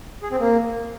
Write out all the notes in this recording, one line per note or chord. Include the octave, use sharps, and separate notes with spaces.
G#4
C4
A#3